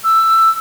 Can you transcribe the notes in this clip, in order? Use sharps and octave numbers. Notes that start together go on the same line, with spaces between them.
E6